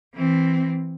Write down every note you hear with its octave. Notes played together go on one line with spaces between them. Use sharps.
E3 C4